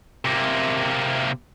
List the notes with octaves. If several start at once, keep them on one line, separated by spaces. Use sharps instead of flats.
C3 A#3